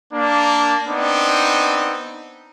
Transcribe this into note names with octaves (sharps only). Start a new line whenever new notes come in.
A#3 D4
B3 C4 D4 D#4